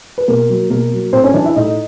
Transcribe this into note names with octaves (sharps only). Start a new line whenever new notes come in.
B4
B2 A#3 A#4
F#3
B2 A#3 A#4
F#3
A2 C4 C5
C#4 C#5
E3 D4 D5
E4 E5
A2 D#4 D#5